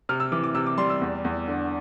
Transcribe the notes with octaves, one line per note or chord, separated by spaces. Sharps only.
C3 F6
E6
E3 D6
D6
C3 E6
D6
G3 C6
E6
E2
E2
D3